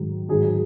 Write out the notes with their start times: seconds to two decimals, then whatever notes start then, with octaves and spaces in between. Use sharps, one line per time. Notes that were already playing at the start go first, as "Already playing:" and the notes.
Already playing: G#2 D#3 F#3
0.29 G#2 D#3 F#3 G#4
0.44 G#4